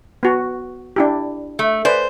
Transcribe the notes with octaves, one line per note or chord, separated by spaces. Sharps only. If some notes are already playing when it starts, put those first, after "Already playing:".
B3 F#4
D4 E4 G4
A3
B4 C5 D5 G#5